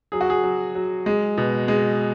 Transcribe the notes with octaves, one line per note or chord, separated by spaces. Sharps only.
F#3 G#4
F#4
G#4
F#3
F#3
G#3
B2
G#3